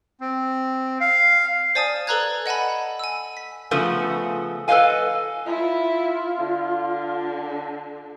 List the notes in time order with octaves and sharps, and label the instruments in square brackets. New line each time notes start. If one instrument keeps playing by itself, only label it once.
[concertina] C4
F5
[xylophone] C5 D5 G#5 A5 D#6
A4 B4 D5 A#5 F#6 G#6
D#5 F#5 G#5 A5 B5
G#5 E6
B6
[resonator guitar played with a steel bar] C#3 F3 A3 B3
A4 B4 C#5 D#5 F5 G#5
[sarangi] E4 [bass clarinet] F4
[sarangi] D3